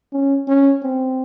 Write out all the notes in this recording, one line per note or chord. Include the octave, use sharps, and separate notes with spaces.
C#4
C#4
C4